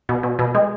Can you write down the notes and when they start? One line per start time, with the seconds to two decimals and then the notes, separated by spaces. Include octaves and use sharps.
0.09 B2
0.23 B2
0.39 B2
0.55 G#3